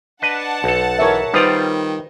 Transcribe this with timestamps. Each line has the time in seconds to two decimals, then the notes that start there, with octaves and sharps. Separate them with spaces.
0.22 D4 B4 D#5 F#5 A5
0.64 B1 A4
0.99 E3 A#4 C#5 E5
1.34 D#3 G3 F4 B4 C5 D5 D#6